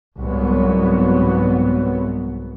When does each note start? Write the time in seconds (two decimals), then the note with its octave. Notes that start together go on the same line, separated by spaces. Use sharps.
0.17 C2 G#2 F#3 B3